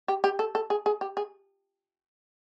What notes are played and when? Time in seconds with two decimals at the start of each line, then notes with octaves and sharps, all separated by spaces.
0.08 G4
0.24 G4
0.39 A4
0.55 A4
0.70 G#4
0.86 G#4
1.01 G4
1.17 G#4